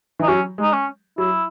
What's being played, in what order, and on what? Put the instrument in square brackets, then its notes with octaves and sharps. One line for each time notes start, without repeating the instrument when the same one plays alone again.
[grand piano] E3 [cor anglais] D#4
[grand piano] F#3 [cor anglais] C#4
[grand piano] G#3 [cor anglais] D#4
[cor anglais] C#4
[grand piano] F#3 [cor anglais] E4